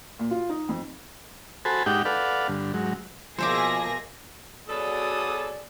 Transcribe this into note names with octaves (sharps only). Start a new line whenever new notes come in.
A#2
F4
D#4
F2
F#4 A4 C5 G#5 A5 B5
G#2 D#4 G4 F#5 G5 D6
A4 B4 D5 F5 F#5
G2 D3
G#2 F#3
B2 F3 A#3 G#4 C5 E5 D6 A#6
B2 F#3 G#4 A4 D5 D#6